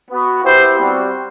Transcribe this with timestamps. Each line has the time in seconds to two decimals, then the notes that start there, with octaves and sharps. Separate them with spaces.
0.11 B3 F#4
0.44 B3 E4 G4 C5
0.76 G3 C4 F#4